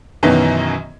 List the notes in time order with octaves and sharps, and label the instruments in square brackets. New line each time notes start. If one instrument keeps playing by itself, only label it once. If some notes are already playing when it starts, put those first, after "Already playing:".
[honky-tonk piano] F#2 B2 D#3 E3 F#3